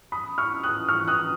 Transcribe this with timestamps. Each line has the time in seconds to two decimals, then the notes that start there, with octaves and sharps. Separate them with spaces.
0.12 B5 D#6
0.38 C#6 F6
0.63 D#6 F#6
0.88 C#6 F6
1.08 D#6 F#6